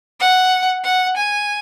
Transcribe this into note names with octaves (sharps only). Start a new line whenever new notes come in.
F#5
F#5
G#5